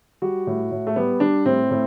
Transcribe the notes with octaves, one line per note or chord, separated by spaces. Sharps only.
G3 F#4
A2
A2
A3
G3 B3
G3 D4
A2 C4
A2